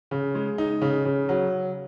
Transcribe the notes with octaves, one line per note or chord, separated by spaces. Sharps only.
C#3
G#3
D#4
C#3
C#3
F#3